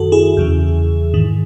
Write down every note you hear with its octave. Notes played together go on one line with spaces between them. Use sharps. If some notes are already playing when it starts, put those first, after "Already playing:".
Already playing: F#2 D#3 F#4 A4
E4 G#4
E2 C#3 E3
G#2 D#3